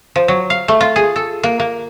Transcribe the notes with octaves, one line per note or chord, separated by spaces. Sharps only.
F3
F#3
F5
A3
F4
G#4
A4
A#3
A#3